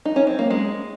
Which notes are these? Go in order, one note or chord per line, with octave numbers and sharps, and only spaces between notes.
D#4
C#4
C4
A#3
G#3